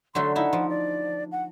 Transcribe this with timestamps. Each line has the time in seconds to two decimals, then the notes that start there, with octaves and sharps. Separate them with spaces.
0.15 D3 F#3 A3 C6
0.36 D#4 E4 F#5
0.53 F3
0.69 D5
1.32 F#5